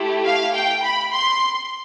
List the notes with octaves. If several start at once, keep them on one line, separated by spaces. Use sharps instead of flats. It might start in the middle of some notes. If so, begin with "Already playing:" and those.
Already playing: A3 E4 G4
F5
G5
B5
C6